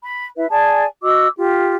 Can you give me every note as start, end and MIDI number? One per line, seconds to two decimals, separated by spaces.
0.04 0.25 83
0.37 0.47 64
0.37 0.47 71
0.37 0.47 76
0.50 0.86 68
0.50 0.86 74
0.50 0.86 80
0.50 0.86 81
1.03 1.28 66
1.03 1.28 75
1.03 1.28 86
1.03 1.28 88
1.37 1.75 65
1.37 1.75 67